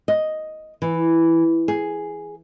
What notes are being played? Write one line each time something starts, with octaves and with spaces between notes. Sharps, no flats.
D#5
E3
G#4